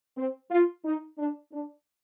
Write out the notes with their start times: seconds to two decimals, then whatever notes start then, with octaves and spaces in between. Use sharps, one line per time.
0.18 C4
0.51 F4
0.85 D#4
1.18 D4
1.52 D4